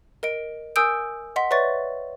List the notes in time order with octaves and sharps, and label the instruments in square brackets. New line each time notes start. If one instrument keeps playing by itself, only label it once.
[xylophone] A#4 D#5 D7
A#4 G#5 D#6 E6 G6 D7
D#5 F#5 C6 B6
B4 C#5 D5 E5 C#6 A6